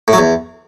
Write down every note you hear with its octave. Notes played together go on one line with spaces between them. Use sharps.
A2
F#3
E2